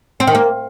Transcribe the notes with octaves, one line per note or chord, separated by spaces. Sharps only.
C4
D#3
A#3